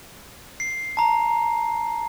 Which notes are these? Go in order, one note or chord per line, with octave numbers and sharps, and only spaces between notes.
C7
A5 A#5